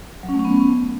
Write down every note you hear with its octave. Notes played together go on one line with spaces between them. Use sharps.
F#3
C#4
A3
C#4
B3